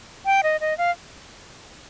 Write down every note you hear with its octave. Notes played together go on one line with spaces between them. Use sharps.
G5
D#5
D#5
F5